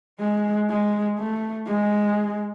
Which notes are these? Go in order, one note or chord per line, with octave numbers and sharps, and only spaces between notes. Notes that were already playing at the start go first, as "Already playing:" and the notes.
G#3
G#3
A3
G#3